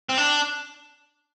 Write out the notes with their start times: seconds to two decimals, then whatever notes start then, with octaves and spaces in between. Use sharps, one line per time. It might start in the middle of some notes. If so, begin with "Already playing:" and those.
0.09 C4
0.17 D4